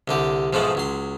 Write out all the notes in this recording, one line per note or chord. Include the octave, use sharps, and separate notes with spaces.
C2 D3 G4
B1 G#2 F3 G#3 A3 F#5
C#2 F#3 C6